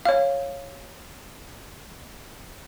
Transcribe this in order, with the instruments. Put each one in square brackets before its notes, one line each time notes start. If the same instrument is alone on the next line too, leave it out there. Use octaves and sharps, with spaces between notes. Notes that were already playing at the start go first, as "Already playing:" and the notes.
[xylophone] C#5 F5